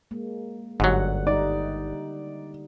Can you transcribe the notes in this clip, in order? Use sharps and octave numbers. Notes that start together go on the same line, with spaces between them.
G#3 A#3
G1 G#2 D3 F#3 G3 F#5
G3 D#4 D5